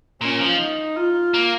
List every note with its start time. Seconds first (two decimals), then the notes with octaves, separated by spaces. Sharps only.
0.21 A#2 C#4
0.39 F3
0.59 D#4
0.96 F4
1.34 A#3